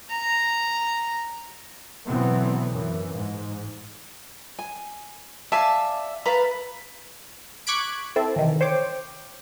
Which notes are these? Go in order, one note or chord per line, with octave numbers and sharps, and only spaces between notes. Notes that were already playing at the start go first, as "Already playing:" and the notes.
A#5
B2 D3 E3 F#3 B3 C4
F#2 E3
G#2
G#5
D5 E5 F5 G#5 A5
B4 F5 A5 A#5
C#6 D6 F#6 G#6 B6 D7
C4 E4 A4
C3 D#3 E3
C5 C#5 G5 D6